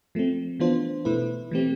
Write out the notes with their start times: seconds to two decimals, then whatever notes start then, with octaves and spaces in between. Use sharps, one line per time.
0.15 F3 A3 C4
0.60 E3 B3 D4 F4 C5
1.05 B2 A3 E4 B4
1.51 E3 A3 C4 G4